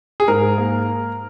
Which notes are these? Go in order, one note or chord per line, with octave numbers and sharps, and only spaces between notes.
G#4
G#2 A#4
A#3